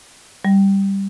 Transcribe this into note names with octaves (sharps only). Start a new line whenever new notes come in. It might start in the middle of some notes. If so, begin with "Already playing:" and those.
G3